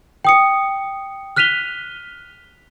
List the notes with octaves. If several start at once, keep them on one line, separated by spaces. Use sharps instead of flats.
G5 D#6 C#7
F6 F#6 B6 D#7 F7 G7